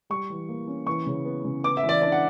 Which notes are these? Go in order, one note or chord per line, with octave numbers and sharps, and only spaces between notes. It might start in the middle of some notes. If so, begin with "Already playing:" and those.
G3 C#6
E3
A#3
C#4
E3 C#6
C#3
B3
C#3
B3 D6
E5
E3
D5
D4 D5
F#5